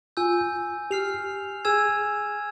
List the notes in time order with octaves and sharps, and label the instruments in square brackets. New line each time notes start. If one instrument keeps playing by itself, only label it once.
[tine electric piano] F4 [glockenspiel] G#5 E6 G6
[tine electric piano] G4 [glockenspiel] F6 C7 F7
[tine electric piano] G#4 [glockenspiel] G#5 E6 G#6 E7